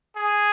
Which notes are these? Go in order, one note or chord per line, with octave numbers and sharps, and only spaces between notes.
G#4